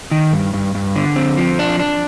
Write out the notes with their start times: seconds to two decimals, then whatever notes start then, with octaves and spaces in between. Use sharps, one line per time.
0.11 D#3
0.33 G2
0.54 G2
0.75 G2
0.96 D3
1.16 C4
1.37 F3
1.59 D4
1.80 D4